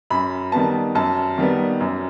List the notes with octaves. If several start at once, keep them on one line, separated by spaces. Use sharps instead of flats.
F#2 B5
D#3 G3 B3 A5
F#2 A5
D#3 G3 B3
F#2